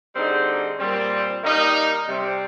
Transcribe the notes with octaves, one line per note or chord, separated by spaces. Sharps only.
D3 G3 C4 D#4 G#4
A#2 G3 C4
D#3 G3 A#3 D#4
C3 G3 C4